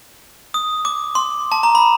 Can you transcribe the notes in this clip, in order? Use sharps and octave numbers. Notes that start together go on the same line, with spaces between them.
D#6
D6
C6
A5
A#5
B5